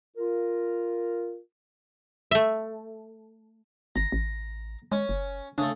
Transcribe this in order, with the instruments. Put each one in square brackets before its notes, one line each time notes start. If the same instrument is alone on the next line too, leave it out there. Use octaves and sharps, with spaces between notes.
[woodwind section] F4 A#4
[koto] A3 E5
[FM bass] G#1 [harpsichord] A#5
[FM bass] A1
[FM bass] G#3 [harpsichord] C#4
[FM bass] F#1
[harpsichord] C#3 A3 [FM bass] D4